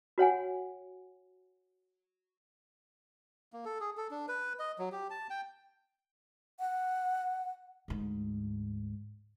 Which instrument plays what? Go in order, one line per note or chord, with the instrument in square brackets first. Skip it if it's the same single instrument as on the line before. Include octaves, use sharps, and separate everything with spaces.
[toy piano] F#4 C#5 F#5 G#5
[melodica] A#3
A4
G#4
A4
D4
B4
D#5
F#3
G4
A5
G5
[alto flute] F#5
[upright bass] D2 G#2